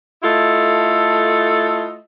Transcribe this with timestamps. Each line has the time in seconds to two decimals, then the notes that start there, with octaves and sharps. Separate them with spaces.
0.22 A3 E4 F4 A4 D#5